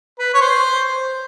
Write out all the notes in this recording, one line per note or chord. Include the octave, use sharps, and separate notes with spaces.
B4
C#5
C5